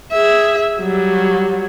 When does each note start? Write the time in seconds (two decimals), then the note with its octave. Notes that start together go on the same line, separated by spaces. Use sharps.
0.12 G#4 E5
0.80 F#3 G3